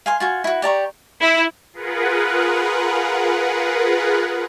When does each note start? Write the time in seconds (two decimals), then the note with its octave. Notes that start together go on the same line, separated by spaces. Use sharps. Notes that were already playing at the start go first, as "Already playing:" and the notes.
0.06 F5 G#5 C6
0.20 F4 F#4 G#5
0.44 E4 F#4
0.62 G4 D5 A#5 C#6
1.20 E4
1.73 F4 G#4 A#4 B4 F#5